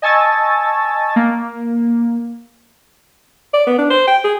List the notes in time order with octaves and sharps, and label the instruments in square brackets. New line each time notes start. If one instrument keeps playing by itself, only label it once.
[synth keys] D#5 G#5 A5 C#6 E6 A6
A#3
[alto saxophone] D5
B3
D4
C5
G5
G#4